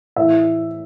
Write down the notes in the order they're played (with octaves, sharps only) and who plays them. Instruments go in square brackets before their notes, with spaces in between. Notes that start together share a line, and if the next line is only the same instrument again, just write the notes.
[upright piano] A2 E3 E5